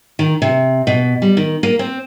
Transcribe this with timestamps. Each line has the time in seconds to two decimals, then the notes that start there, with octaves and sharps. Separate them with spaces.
0.19 D#3
0.42 C3
0.87 B2
1.22 G3
1.37 D#3
1.63 A#3
1.79 C4